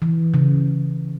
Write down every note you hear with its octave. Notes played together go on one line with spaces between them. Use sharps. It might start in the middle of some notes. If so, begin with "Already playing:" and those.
E3
C#3